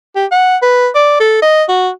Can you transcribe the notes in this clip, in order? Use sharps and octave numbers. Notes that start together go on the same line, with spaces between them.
G4
F#5
B4
D5
A4
D#5
F#4